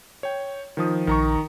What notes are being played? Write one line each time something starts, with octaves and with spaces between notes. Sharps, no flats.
C#5 G5
D#3 F3 D#6
A#1 D#3 A#5 C#6